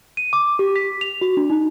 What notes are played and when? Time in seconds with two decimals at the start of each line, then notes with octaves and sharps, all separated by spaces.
0.17 D#7
0.33 D6
0.59 G4
0.76 B6
1.01 F7
1.21 F#4
1.37 D4
1.50 D#4